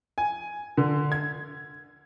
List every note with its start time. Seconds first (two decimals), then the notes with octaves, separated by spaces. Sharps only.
0.18 G#5
0.77 D3
1.12 G#6